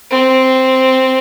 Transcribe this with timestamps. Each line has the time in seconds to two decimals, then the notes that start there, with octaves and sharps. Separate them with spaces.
0.11 C4